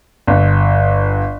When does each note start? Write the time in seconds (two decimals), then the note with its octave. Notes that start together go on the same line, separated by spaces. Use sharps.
0.27 G1